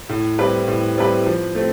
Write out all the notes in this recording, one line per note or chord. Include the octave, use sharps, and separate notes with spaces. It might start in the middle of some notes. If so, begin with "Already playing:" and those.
A2
G3 C4 E4 B4
A2
G3 C4 E4 B4
F3
A3 C4